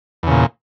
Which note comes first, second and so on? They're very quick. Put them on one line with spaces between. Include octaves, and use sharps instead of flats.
E2 C#3 A#2